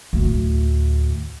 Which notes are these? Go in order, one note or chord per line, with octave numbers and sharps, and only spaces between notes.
D2 A2